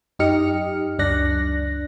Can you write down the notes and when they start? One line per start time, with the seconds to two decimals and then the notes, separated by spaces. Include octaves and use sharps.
0.19 F#2 D#4 G4 D#5 F6 C#7
0.98 C#2 F#2 D4 D5 F#6 A#6